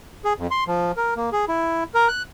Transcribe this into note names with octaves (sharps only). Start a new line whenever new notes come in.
G#4
F2
C6
F3
A#4
A#3
G#4
E4
A#4
F#6